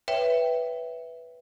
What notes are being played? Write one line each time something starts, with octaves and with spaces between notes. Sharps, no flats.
B4 C#5 E5 G5